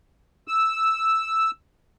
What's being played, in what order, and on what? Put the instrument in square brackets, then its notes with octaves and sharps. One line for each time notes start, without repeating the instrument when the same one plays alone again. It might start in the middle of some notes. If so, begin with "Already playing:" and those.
[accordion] E6